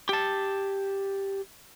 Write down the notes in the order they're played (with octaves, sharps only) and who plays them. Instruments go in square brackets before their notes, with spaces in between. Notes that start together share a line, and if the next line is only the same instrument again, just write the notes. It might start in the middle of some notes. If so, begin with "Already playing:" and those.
[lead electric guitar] G4 A5